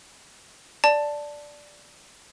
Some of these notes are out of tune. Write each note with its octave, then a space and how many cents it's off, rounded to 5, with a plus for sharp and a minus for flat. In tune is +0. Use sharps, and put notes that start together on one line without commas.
D5 +0 A5 +0